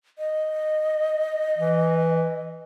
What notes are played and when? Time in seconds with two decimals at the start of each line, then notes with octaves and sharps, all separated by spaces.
0.18 D#5
1.58 E3